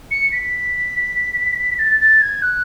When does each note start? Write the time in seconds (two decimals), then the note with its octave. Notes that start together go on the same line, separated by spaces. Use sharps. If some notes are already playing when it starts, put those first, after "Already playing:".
0.11 C#7
0.32 B6
1.79 A6
2.00 A6
2.22 G#6
2.42 F#6